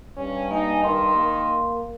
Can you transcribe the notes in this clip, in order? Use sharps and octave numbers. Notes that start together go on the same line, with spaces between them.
G2 C#4
A#3 D#4 G#5
D#3 C6
A#3